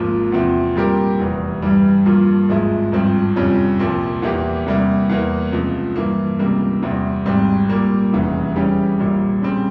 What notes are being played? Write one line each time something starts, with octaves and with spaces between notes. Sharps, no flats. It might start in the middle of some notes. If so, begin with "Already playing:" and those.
Already playing: G#1 G#2 F3 A#3 F4
E2 C3 F3 C4 E4
A#2 G3 C4 G4 A#4
F1 E2 E3
G2 E3 G3
G2 F3 A#3 F4
G#1 G#2 F3 G#3 E4
G#1 G2 F3 C4
F2 C3 G3 C#4 F4
C2 A#2 F3 C4
E2 E3 A#3 E4 G4
E2 C3 G3 A#3 E4
E2 E3 A#3
C#2 C3 F3
G2 E3 A#3
C#2 C3 G3 A#3
E2 C3 G3 C4 E4
G#1 G#2 G3 C4
A#2 G3 A#3
F1 E2 C#3 E3
C#3 E3 G3 C#4 G4
A#1 A#2 G3
C#3 G3 C4